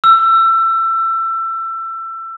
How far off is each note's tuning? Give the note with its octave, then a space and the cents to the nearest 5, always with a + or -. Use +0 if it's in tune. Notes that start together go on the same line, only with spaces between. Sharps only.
E6 +25